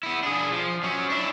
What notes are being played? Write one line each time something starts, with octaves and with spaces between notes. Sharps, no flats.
B3 E4
D4 G#4
F3
F#3 C#4
D4 E4